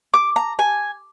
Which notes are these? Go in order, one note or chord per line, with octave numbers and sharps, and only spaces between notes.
D6
A#5
G#5